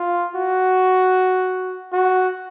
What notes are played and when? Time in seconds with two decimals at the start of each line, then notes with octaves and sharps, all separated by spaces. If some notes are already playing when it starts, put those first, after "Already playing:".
Already playing: F4
0.36 F#4
1.93 F#4